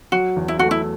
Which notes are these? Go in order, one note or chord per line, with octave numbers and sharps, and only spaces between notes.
F#3 F#4
E2
E4
A3 F#4
E4